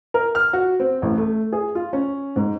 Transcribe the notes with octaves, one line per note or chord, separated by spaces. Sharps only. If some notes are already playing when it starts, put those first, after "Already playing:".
A#4
F6
F#4
C4
A1
A3
G#4
F4
C#4
G#2